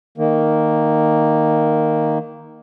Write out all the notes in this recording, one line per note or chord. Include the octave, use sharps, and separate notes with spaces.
D#3 A#3